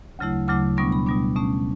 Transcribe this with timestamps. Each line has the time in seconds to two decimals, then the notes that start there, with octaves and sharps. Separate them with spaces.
0.19 D2 C#3 F#3 A3 E4
0.48 D2 C#3 F#3 A3 E4 D6
0.77 B2 G3 B3 D4 C#6
0.92 B5
1.06 B2 G3 B3 D4
1.36 B2 A3 C#4